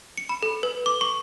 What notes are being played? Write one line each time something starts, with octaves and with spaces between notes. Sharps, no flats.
C#7
B5
A4
B4
D6
C#6